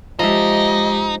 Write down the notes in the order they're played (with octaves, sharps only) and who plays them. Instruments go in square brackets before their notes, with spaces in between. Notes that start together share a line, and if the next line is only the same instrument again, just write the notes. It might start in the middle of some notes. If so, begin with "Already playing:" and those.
[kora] F3 E5 [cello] G#3 G4 [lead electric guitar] D#4 [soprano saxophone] D#5